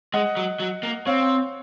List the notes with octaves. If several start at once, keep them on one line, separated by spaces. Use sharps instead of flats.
G#3 D#5 F#5
F#3
F#3
A#3
C4 C#5 F5